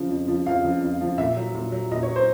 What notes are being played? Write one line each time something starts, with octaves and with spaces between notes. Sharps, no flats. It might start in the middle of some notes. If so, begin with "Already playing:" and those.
Already playing: C#3 F3
F2
C#3 F3
F2 F5
C#3 F3
F2
C#3 F3
A#2 E5
F#3
A#2
F#3
A#2 D#5
C#5
F#3
C5